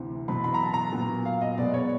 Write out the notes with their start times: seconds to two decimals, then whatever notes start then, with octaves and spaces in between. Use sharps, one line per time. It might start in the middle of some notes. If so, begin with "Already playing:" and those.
Already playing: D2 C3 E3
0.28 E2 B2 F#3 B5
0.44 B5
0.54 A#5
0.63 A5
0.74 A#5
0.92 A#2 F#3 B3
1.25 F5
1.42 D#5
1.58 B2 G#3 B3 D5
1.74 C#5